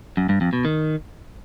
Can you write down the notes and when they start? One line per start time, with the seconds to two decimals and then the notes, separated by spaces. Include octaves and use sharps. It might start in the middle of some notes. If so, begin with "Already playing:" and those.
0.17 F#2
0.29 G2
0.41 F2
0.53 B2
0.65 D#3